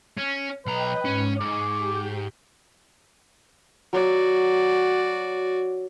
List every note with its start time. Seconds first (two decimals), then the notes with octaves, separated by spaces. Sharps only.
0.18 C#4
0.66 B1 B4 D#5 G5 A#5
1.05 G#2 C#4
1.40 G#2 G#5 C#6 D6
1.77 G4 G6
3.93 F#3 F#4 D5 D#6